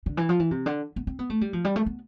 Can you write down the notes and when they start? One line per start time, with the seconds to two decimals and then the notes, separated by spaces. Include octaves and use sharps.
0.06 D3
0.17 E3
0.29 F3
0.40 E3
0.51 C3
0.66 D3
0.96 B3
1.07 C4
1.19 B3
1.30 A3
1.41 G3
1.53 F3
1.64 G3
1.76 A3
1.86 B3